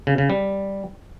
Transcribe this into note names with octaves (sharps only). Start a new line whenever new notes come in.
C#3
C#3
G3